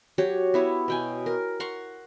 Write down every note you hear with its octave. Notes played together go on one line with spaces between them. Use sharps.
F#3 F#4 G4 C#5
B3 E4 C#5
B2 G5 G#5
A#4
F#5 A#5 C6 C#6